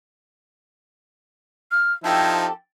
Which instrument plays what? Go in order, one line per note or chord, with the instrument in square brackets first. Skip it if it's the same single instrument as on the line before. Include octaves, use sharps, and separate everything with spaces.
[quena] F6
[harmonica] F3 D#4 E4 [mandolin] C4 G4 A4 [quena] A5